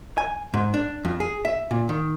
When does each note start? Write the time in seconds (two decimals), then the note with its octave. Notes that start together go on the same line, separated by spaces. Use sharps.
0.18 G#5
0.54 G#2
0.74 D4
1.05 F2
1.20 G#4
1.45 E5
1.71 A#2
1.89 D#3